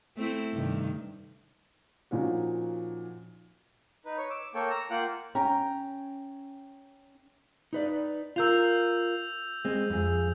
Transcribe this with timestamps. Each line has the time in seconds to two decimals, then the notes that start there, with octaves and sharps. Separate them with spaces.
0.17 A3 C4 E4
0.52 G2 C3 D#3
2.11 A#2 F3 C#4 D#4 F#4
4.05 D#4 B4
4.18 C#5
4.30 D6 E6
4.54 A#3 A4 C#5 G5
4.70 A#5 E6
4.91 A#3 F4 F#5 G5 F#6
5.35 C#4 G5 A#5
7.73 D#4 B4 D5
8.36 F4 A#4 E6 G6 F7
9.65 G#3 C4
9.90 F2 G#4